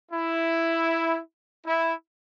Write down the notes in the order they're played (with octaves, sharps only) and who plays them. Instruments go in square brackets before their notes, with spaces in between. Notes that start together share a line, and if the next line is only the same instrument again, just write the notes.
[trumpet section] E4
E4